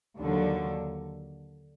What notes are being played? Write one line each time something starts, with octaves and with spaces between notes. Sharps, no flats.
D#2 D3 F#3